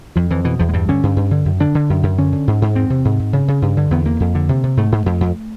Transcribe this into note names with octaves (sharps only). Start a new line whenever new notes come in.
F2 F3
F2 E3
B2 E3
E2 F3
G#3
G2 G3
D3 C#4
G2
G2
D3
F#2
D3 D4
D3
F#2
F#2
D3 C#4
D3
G#2
G#2
E2 C4
C3
G#2
G#2
C#3
C#3
G2
D3
E2 B3
E2 A#3
F2
D3
C3
C3
G#2 A3
G#2
F2
F2